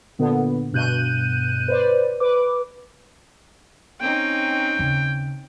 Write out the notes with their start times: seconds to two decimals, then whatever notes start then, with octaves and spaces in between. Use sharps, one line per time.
0.19 A#2 D3 B3
0.72 G2 B2 F#6 G6 D#7
1.68 B4 C5 D5
2.20 B4 D6
4.01 C4 C#4 D#4 G5
4.79 D#2 C#3